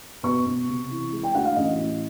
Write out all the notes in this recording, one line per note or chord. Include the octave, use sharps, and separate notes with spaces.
B2 C#6
B2
C3
E3
G#3
G5
D2 F#5
F5
A1 D#5
A2